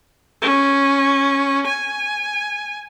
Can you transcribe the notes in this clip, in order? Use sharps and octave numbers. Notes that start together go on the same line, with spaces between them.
C#4
G#5